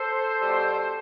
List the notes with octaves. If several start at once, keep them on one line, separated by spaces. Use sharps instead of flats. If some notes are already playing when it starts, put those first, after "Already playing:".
Already playing: A4 C5
B2 G3